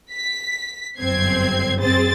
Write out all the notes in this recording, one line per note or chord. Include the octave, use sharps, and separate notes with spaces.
B6
G1 F#2 C4 G#6 C7
F#2 C4 G#4 C5 A6